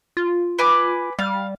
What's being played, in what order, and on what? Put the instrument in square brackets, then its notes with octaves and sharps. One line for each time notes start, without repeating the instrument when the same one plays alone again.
[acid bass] F4
[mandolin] B4 G#5 D6
[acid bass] G3 [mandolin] F5